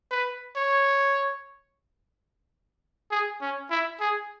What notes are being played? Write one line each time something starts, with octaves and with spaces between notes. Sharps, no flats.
B4
C#5
G#4
C#4
E4
G#4